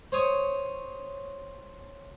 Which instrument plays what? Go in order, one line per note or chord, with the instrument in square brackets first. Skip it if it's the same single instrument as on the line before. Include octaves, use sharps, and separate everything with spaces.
[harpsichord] C5 C#5 D#6